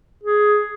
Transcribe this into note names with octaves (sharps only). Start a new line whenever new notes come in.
G#4